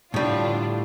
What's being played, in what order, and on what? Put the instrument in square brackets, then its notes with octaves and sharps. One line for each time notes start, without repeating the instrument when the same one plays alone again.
[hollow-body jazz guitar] A2 G3 [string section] D3 D4 F4